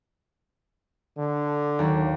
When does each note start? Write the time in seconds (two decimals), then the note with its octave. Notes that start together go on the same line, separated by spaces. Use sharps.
1.18 D3
1.79 D#2 F#3